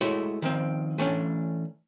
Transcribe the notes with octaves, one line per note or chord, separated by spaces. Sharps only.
G#3 A3 E4 F#4 C#5
D#3 F3 C4
E3 A3 C#4 D4